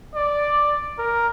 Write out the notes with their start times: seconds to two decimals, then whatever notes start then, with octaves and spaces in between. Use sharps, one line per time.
0.15 D5
0.99 A#4